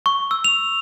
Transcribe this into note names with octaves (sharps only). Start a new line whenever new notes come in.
C#6
E6
F7